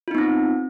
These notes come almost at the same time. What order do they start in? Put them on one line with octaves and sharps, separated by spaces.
F4 D#4 B3 C4